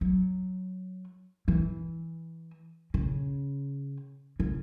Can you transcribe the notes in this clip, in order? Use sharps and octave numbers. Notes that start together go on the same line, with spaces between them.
F#3
E3
C#3
C#3